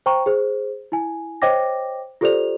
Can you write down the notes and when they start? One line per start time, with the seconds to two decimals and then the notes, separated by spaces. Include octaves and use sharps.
0.06 C5 G5 A#5 C#6
0.26 G#4 C5
0.92 E4 G#5
1.42 C5 C#5 D#5 G5 D6 A#6
2.21 F4 G4 A4 C5 D5 F7